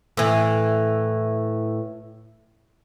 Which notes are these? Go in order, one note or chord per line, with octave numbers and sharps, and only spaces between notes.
A2 E3